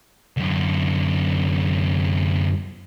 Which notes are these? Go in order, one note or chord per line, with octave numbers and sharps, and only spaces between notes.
F#2 D3